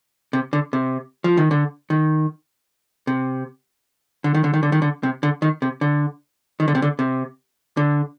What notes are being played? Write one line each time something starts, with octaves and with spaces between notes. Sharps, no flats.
C3
D3
C3
F3
D#3
D3
D#3
C3
D3
D#3
D3
D#3
D3
D#3
D3
C3
D3
D#3
C3
D3
D#3
D3
C3
D3
C3
D3